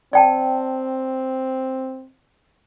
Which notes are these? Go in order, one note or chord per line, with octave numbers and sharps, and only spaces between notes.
C4 D5 G5 A5